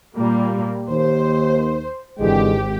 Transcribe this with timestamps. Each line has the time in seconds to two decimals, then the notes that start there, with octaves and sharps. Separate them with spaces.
0.16 A#2 G3 A#3
0.89 D#2 C5
2.19 G#1 D3 E3 G#3 G4